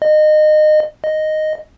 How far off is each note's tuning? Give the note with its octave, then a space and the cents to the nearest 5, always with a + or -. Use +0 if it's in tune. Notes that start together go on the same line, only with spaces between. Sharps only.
D#5 -25
D#5 -5